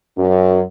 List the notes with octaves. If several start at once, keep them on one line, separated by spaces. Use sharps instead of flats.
F#2